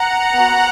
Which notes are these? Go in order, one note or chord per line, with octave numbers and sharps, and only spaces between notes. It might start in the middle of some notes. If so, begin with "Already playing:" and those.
Already playing: F#5 A#5
B3 F#4